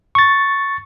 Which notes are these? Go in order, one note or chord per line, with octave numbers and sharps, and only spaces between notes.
C#6 A6